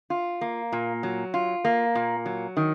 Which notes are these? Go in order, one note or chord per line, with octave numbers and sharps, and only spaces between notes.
F4
A#3
A#2
F#3
F4
A#3
A#2
F#3
D#3